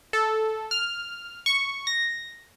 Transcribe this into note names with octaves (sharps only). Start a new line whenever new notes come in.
A4
F6
C#6
A#6